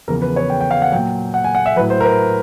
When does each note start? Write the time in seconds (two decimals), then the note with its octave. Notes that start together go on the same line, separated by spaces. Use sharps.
0.08 E2 C#3 F3 A#4
0.22 B4
0.36 C#5
0.50 G5
0.61 G5
0.71 F5
0.82 F#5
0.92 A#2 F#3 G5
1.34 F#5
1.44 G#5
1.55 F#5
1.66 E5
1.76 A2 F#3 B4
1.90 C5
2.01 A#4
2.04 B4